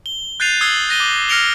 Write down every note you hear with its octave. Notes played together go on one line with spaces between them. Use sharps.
G7
F#6 G6 A6 C7 D#7 F7
D#6 E6 G#6 C7 G7
F#6 A#6 D#7 G7
D6
F6 A#6 C#7 D7 F7 G7